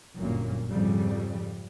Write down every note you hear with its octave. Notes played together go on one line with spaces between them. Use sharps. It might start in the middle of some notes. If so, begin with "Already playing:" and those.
G1 F#2 A#2 A#3
F2 G#2 C#3 F3 G3